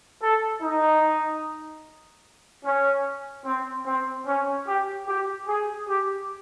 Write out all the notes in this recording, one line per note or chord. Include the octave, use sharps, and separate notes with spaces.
A4
D#4
C#4
C4
C4
C#4
G4
G4
G#4
G4